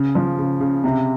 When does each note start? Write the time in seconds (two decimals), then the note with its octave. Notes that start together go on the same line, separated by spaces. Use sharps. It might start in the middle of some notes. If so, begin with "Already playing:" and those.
Already playing: C#3
0.15 F3
0.38 C#3
0.60 C#3
0.84 C3